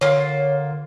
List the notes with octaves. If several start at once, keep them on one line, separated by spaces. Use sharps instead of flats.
D3 A#3 F4 C#5